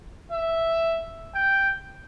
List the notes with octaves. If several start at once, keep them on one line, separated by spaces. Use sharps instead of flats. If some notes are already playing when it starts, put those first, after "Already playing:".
E5
G5